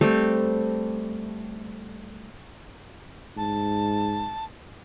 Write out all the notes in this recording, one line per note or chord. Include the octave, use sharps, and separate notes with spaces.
G3 A3 C4
G#2 A5